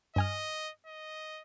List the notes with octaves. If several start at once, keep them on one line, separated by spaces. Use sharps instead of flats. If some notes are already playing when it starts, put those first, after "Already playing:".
G2 D#5 G#5 F6
D#5